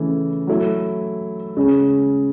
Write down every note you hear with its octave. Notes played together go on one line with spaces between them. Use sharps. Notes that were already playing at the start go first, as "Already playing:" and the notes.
Already playing: C#3 E3 A3
F#3 A3 E4
C#3 G#3 C#4